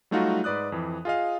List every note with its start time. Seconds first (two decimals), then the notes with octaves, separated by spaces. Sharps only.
0.11 F#3 G3 A3 D#4 F4 F#4
0.44 G#2 B4 D5 D#6 F#6
0.72 F2 E3
1.05 F4 G#4 D#5 F5